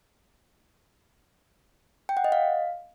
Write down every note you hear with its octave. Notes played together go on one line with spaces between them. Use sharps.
G5
F#5
D#5
F5